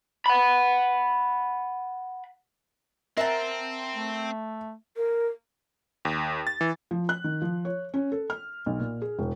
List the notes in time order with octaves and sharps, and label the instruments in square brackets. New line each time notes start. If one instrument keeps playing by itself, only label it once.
[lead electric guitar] F#5 B5
[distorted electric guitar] C4 [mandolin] A#4 F#5 A5 [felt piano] E5
[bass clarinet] A3
[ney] A#4
[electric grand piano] D#2
A6
E3
[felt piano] F3
F#6
D#3
F3
C#5
C#4
A4
F6
B1
A#2
G#4
E1